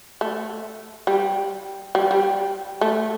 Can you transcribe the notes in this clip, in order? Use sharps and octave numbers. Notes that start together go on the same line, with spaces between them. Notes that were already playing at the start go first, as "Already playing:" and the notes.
A3
G3
G3
G3
A3